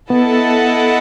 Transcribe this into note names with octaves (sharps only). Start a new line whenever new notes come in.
B3 E4 A4 D#5 F#5 A5